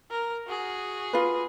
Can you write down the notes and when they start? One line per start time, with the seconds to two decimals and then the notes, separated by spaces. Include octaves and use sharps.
0.10 A#4
0.47 F#4 G#4
1.13 F4 B4